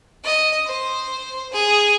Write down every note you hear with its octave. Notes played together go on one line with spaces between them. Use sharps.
D#5
C5
G#4